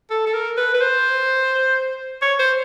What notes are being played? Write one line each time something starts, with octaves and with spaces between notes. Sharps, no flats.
A4
A4
A#4
B4
B4
C5
C#5
C5